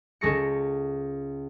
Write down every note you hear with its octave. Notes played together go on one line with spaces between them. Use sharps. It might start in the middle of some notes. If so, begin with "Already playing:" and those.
C#2 G#3 A4 C#6 A#6 C#7